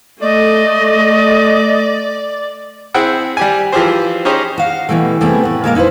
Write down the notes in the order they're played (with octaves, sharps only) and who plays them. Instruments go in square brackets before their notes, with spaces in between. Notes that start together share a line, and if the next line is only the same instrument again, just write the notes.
[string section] A3 [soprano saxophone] D5 [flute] D#5
[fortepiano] C4 E4 G#4 F#5 G5
G3 G4 G#5
E3 F3 G4 G#4 C5
C#4 D#4 G4 G#4 C5 C#5
[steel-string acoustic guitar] F#4 F5
B2 D#3 E3 G3 A3
C3 E3 G3 A3 B3 G#4
A2 F#5
A#2 G#3 A#3 A#4 D#5 F5
D#4 E4 A4 B4 C5